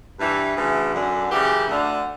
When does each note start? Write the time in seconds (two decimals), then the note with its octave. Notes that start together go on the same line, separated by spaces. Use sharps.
0.19 G2 E3
0.56 D2 C#3 E3
0.93 F#2 D3
1.30 F#2 C#3 E3 G4
1.67 D2 D3